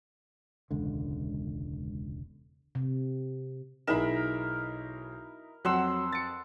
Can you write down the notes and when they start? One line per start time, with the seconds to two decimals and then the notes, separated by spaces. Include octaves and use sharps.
0.71 E1 C#2 D3
2.75 C3
3.87 B1 D#4 E4 G#4 A#4 B5 E7
5.65 F2 F#3 F#5 C6 E6
6.13 A6 C#7